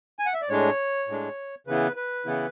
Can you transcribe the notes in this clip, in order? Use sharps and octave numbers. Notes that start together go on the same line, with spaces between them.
G#5
F#5
E5
D5
A2 G#3 D4 C#5
A2 G#3 D4
C#3 E3 B3 E4 B4
B4
C#3 E3 B3 E4